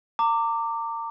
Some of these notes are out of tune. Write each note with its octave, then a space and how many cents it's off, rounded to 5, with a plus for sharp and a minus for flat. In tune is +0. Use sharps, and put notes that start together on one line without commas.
A#5 -35 D6 +0